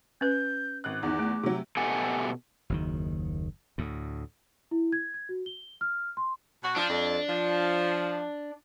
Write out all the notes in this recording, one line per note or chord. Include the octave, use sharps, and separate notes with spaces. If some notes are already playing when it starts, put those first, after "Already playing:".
C#4 B4 G6
G#1 F#6
E2 D#3 D6
A3
C3 F#3
B2 A3 G4 A4 F#5 G#5
F#1 D#2 D#3
D2 A2
E4
G#6
G#6
F#4
G7
F6
C6
B2 F#4
F3 D4
F2
F3